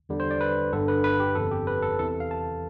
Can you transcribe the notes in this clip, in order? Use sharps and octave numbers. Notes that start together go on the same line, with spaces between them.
E2 D3 G3
C5
D5
B4
G1 G2 D3 A4
B4
B4
G4
G1 F2 C3 A4
G4
B4
A4
E2 C3 E3 A4
F5
A5